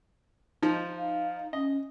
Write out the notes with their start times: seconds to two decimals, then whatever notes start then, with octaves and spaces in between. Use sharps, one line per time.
0.63 F3 D#4
0.97 F5
1.53 C#4 D#5